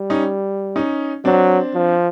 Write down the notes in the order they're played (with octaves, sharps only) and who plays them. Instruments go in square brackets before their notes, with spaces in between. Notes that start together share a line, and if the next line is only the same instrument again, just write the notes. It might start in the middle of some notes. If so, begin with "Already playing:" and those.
Already playing: [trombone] G3
[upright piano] C#4 D#4
C#4 D#4
[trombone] F#3 [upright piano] C4 D4
[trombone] F3